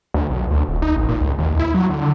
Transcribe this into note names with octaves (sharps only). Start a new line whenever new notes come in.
D2
B1
D2
D#1
D#4
A1
A#2
C#2
D#2
E4
F#3
D3